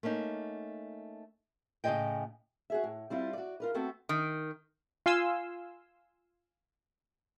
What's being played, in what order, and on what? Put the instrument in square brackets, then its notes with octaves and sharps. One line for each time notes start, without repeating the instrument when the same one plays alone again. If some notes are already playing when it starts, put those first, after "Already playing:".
[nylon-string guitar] A3 A#3 C#4 D#4
A2 C#3 G#3 G#4 D#5 G5
[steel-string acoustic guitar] F#4 G#4 E5
A2
G3 C4 E4 F4
F#4 D5
F4 A#4 B4
A3 B3 C4 F#4 A4
[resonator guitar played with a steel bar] D#3
[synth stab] F4 F5 G#5 C6 E6